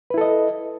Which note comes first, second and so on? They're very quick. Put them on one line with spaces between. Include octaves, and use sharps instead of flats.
B4 E4 A4 D#5